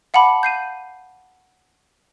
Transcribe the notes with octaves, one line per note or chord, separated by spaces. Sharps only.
F5 F#5 A5 B5 D6
G6 C7 D#7